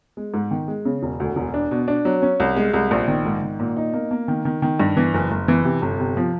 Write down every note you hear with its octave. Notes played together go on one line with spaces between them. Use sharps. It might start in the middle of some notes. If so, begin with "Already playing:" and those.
G#3
G#2
D#3
G#3
C#3
E1
D2
E1
D4
B2
D4
F#3
C#4
C2
G#3
C2
A#1
D#3
G#2
D#3
A#2
D#4
A#3
A#3
D#3
D#3
D#3
G2
E3
F#1
F#1
E3
C3
G1
C3
F3